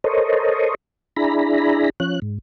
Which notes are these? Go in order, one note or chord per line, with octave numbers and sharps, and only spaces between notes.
A4 A#4 C5 C#5 D#5
D4 E4 G#4 A#5 B5
F3 C#4 F#6
G#2